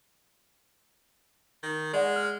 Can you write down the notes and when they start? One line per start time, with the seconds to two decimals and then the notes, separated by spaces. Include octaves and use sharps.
1.63 D#3
1.93 G#3 D5 D#5 F#5
2.16 F6